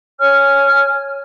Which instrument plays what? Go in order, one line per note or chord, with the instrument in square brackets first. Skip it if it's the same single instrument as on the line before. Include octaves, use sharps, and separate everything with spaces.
[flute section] C#5 G#5 F6